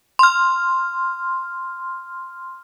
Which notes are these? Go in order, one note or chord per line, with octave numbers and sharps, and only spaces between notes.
C6 F6